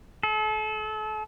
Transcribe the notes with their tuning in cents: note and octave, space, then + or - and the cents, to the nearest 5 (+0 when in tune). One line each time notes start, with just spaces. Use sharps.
A4 -35